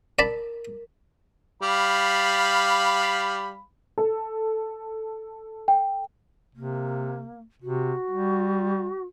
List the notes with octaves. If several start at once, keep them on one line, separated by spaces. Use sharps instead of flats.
A#4 D5 A5 B5
G3 F5 B5
A4
G5
C3 A#3
C3 F#4
G3